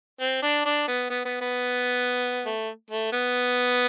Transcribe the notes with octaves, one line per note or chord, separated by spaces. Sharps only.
C4
D4
D4
B3
B3
B3
B3
A3
A3
B3